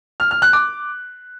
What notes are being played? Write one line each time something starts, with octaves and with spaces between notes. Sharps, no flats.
F6
F6
F#6
D6